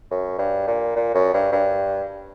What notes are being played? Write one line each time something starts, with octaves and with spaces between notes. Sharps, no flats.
F#2
G2
A#2
A#2
F#2
G2
G2